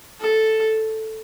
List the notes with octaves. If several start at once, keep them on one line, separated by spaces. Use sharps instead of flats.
A4